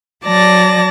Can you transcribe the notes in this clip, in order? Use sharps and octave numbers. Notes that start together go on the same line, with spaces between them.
F#3 D5 A5 A#6